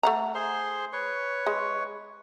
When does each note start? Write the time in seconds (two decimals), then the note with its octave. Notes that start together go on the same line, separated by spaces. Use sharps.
0.03 A3 F#5 A#5
0.35 G#4 C5 C6
0.93 B4 C#5 C#6
1.46 G#3